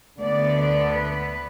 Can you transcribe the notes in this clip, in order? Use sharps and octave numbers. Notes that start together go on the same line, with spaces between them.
D2 D3 B3 D5
D5
B4